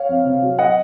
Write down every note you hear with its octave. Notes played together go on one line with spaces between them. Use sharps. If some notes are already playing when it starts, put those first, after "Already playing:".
Already playing: C#5 F5
F2
C3
F#3
D#5 F#5